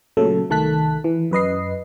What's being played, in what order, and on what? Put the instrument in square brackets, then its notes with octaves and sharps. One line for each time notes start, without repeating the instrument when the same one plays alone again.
[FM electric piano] A#2 C#3 F#3 A3 A4
C2 D#3 A3 A5 F#6 B6
E3
F#2 B4 D#5 C7